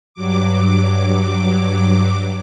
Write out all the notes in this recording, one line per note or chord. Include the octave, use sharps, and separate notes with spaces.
G2 F#3 D6